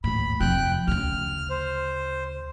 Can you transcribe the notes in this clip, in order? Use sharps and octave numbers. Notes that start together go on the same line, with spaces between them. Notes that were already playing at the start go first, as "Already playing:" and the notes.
D#2 A2 B5
F2 C3 G5 F#6
D2 C#3 F6
C5